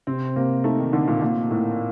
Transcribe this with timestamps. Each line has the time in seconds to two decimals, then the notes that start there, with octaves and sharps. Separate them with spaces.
0.07 C3 C4
0.36 C3 A#3
0.64 A3 D#4
0.79 D#3
0.93 D3 D#4
1.08 A#2
1.22 A#2 A#3
1.50 A2 A#3